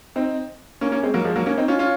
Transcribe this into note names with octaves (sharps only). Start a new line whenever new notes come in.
C4 D#4
A#3 C#4
A#3 C#4
G#3 C4
F#3 A#3
F3 G#3
F#3 A#3
A#3 C#4
C4 D#4
C#4 F4
C#4 F4